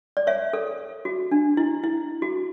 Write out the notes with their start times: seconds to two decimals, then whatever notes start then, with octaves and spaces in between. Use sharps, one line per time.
0.17 D5
0.27 C#5 E5
0.53 A4
1.05 F#4
1.31 D4
1.57 E4
1.84 E4
2.22 F#4